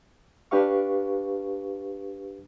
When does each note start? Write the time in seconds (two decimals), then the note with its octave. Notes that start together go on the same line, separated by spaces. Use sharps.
0.51 D4 G4 B4 F5 C#6